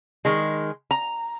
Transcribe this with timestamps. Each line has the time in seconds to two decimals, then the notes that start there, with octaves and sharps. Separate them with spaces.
0.25 D#3 G#3
0.91 A#5